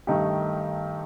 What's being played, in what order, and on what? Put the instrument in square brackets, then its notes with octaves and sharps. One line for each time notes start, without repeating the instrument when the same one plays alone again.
[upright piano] G2 D#3 A3 D#4 G4